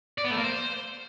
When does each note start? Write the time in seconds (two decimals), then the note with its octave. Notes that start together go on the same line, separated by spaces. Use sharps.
0.18 D5
0.24 B3
0.31 A3
0.37 A#3
0.44 C5